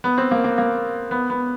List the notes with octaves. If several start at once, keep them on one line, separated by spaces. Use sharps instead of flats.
B3
C4
A#3
A#3
A#3
B3
B3